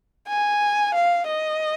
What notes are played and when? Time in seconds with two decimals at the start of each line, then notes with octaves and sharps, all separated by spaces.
0.28 G#5
0.94 F5
1.27 D#5